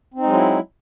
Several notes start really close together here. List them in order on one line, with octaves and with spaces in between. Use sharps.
C4 D#4 G#3 F#3 E4